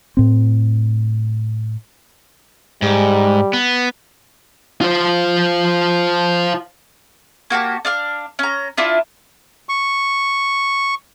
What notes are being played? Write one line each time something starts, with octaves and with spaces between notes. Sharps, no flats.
A2 C4
G#2 G3
B3
F4 C5
A#3 F#4 G4 A5
D4 F5 F6
C#4 A#5
D4 E4 F4
C#6